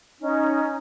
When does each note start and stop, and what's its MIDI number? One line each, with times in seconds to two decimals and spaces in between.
0.20 0.76 61
0.20 0.76 63